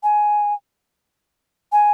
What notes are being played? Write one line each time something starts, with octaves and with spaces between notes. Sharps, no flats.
G#5
G#5